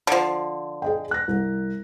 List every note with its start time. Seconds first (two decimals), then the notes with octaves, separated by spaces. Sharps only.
0.07 D3 F3
0.82 G#4 D#5 G5
1.11 F#6 A#6
1.28 C2